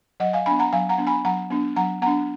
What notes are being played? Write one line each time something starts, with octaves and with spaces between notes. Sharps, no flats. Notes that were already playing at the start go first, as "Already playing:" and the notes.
F#3 D#5 F#5
F5 G#5
B3 D4 G#5 B5
F#5 A#5
F#3 F5 G#5
F#5 A#5
B3 D4
G#5 B5
F#3 F#5 A#5
B3 D4
F#3 F#5 A#5
B3 D4 F#5 A#5